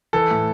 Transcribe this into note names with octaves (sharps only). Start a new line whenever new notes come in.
E3 A4
A2